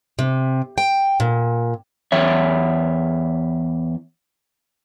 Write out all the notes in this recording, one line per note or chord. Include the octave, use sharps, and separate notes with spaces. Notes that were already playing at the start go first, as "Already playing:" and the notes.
C3
G5
A#2
E2 C#5 E5